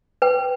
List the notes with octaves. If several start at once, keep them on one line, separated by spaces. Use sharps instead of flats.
B4 G5